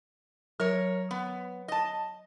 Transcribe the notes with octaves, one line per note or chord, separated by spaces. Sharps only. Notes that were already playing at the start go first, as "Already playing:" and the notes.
F#3 A#4 C#5
B3
D#5 A5